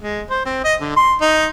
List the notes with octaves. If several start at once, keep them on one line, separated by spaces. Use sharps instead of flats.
G#3
C5
C4
D#5
D3
C6
D#4